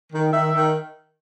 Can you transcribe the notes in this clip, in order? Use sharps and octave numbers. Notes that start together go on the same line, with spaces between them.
D#3
D#3 E5
D#3